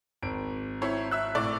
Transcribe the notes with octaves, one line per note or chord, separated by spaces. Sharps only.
G#1 D7
C4 E4 C#5
E5 E6 F#6
A2 D5 C#6